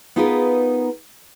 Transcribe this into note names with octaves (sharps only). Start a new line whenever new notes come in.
B3 D#4 F4 G#4 A#4 B4